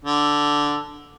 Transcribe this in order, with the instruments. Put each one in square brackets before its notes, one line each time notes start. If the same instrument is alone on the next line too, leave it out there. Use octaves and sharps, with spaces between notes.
[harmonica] D3